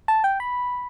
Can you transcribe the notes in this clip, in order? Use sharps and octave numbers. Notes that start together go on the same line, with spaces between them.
A5
G5
B5